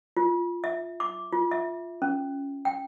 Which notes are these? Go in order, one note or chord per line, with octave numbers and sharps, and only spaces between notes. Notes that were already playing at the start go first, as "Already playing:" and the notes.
F4
E5
D6
F4
E5
C#4
G5